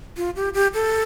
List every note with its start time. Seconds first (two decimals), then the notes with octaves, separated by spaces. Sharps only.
0.17 F4
0.36 G4
0.54 G4
0.74 A4